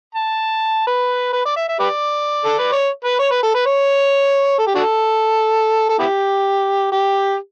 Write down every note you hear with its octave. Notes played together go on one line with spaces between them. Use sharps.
A5
B4
B4
D5
E5
E5
G4 B4 D5
A4
B4
C#5
B4
C#5
B4
A4
B4
C#5
A4
G4
D4 F#4 A4
A4
B3 E4 G4
G4